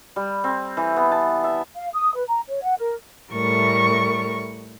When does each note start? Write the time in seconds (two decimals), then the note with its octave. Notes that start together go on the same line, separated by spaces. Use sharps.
0.16 G3
0.44 C4
0.77 E3
0.96 B3
1.12 A5
1.44 E5
1.75 F5
1.93 D#6
2.15 B4
2.29 A#5
2.48 C#5
2.63 F#5
2.78 A#4
3.31 A2 G3 A3 A#4 C#6